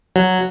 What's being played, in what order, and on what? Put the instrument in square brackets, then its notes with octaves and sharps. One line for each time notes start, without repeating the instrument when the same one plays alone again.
[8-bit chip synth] F#3